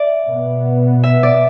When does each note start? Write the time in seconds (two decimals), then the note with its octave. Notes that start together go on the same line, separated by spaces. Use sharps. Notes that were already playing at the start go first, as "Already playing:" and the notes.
Already playing: D5 E5
0.27 B2 B3
1.04 E5
1.23 D5